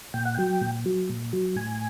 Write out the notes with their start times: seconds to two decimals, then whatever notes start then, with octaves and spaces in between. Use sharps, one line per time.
0.14 A#2 G5
0.25 F#5
0.35 F#3 G5
0.61 A#2
0.86 F#3
1.09 A#2
1.33 F#3
1.56 A2 G#5